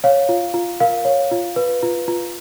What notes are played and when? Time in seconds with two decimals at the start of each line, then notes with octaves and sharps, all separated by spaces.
0.04 C#5 F5
0.29 F4
0.54 F4
0.80 A#4 F5
1.05 C#5
1.32 F4
1.56 B4
1.83 F4
2.08 F4